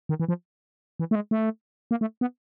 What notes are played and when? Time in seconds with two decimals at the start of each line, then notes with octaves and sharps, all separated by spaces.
0.09 D#3
0.20 E3
0.29 F3
1.00 E3
1.11 A3
1.15 G#3
1.31 A3
1.91 A#3
2.01 A3
2.21 B3